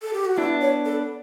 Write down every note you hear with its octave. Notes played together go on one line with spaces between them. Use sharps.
A4
G4
F#4
B3 D4 E4
C#5
A4